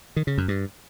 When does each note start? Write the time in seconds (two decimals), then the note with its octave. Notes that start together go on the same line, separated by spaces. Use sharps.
0.16 D#3
0.27 C#3
0.38 F#2
0.48 G2